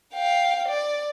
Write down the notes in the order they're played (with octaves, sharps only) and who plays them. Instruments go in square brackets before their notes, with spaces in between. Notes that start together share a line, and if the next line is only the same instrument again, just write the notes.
[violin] F5 G5
D5